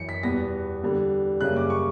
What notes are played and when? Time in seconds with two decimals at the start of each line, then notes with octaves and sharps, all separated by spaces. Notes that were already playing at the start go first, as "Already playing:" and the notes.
Already playing: F#2 E3 C#7
0.09 B6
0.23 E2 B2 G3 B3 A#6
0.83 E2 D3 G3
1.41 F#2 C#3 G3 A#3 F#6
1.56 D6
1.70 C#6